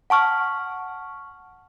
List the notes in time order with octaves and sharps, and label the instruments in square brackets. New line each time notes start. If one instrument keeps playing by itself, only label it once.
[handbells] F#5 A5 C#6 F6